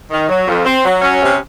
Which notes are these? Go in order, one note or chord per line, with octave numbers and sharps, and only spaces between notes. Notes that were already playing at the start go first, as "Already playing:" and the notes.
D#3
F#3
F2
C4
F#3
C#4
C3